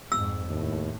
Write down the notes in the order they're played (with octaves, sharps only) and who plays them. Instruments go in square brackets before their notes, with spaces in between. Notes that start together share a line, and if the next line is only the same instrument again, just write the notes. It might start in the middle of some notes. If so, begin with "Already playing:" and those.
[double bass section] F2 G#2 [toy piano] E6
[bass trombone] D#2 [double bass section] A2